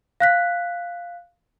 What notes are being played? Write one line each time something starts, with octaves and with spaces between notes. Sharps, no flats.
F5 F#6 B6